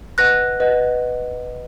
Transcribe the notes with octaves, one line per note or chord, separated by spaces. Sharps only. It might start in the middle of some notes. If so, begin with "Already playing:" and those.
B4 D#5 F#5 F#6 A#6
B4 D#5 F#5